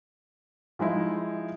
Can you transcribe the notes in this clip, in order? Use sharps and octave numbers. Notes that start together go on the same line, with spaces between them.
F3 G#3 D#4 E4